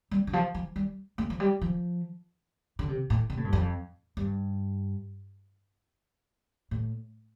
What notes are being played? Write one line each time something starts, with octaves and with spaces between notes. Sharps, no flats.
G3
D3
F3
F3
G3
A3
F3
G3
F3
D3
C3
A2
C3
A2
G2
F2
G2
A2